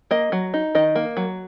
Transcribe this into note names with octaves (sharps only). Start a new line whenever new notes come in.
A#3 D#5
F#3
D#4
D#3 D#5
A#3
F#3